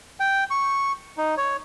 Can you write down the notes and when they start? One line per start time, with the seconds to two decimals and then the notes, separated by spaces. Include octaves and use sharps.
0.20 G5
0.51 C#6
1.18 D#4
1.37 C#5